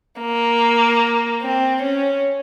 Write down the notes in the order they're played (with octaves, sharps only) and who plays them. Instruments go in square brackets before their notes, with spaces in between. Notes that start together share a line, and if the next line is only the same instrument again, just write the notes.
[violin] A#3
C4
C#4